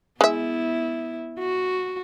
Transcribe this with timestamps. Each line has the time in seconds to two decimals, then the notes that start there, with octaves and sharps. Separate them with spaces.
0.21 G#3 B3 E4 E5
1.39 F#4